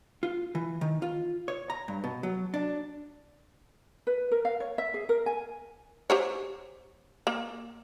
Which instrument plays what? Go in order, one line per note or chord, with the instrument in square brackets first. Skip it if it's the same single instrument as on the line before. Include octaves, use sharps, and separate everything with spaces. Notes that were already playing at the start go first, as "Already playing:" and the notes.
[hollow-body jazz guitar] F4
E3
D#3
F4
C#5
A#5
G2
B2
F#3
D4
[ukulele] B4
A#4
F5
C#5
E5
G#4
A#4
G#5
[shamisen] G4 C5 C#5
A#3